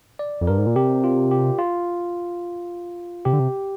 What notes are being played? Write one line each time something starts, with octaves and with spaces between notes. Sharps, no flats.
D5
F2
G2 A#4
G#2
A#2
C3 G4
F4
G4
F4
C3 G4
D3
C3